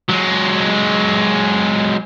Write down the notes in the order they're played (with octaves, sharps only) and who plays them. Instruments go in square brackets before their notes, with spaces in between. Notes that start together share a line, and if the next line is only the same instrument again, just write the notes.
[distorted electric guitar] F#3 G#3